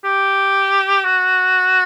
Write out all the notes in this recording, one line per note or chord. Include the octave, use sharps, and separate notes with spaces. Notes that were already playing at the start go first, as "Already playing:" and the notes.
G4
F#4